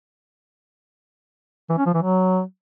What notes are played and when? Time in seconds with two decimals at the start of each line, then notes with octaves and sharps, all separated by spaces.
1.69 E3
1.77 C#4
1.86 F3
1.94 E3
2.02 F#3